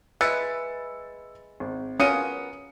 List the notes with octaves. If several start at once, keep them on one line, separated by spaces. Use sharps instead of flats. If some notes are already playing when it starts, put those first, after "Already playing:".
G#3 E4 B4 E6 A6 C#7
G#1
B3 C#4 F4 A#4 D#6 C#7 D#7